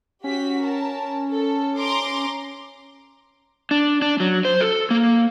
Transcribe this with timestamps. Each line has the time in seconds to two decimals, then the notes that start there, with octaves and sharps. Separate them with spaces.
0.24 C#4 F#4 G4 B6
0.60 A#4 A5
1.31 A4
1.79 A#5 C6 D6
3.71 D4
4.02 D4
4.20 F#3
4.45 C5
4.60 A4
4.91 A#3